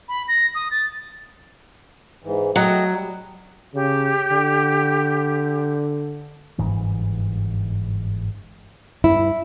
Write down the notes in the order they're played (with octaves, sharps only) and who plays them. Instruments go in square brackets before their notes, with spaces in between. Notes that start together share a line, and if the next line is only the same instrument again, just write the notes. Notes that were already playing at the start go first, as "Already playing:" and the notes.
[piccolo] B5
A#6
D#6
A6
[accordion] G#2 E3
[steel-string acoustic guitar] F#3 [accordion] A3 D#5 G5
[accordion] G3
[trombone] C#3 [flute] G4
[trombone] D3
[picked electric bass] G1 G#2 E3
[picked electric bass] G2 [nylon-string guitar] E4